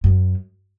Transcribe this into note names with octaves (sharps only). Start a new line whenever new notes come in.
F#2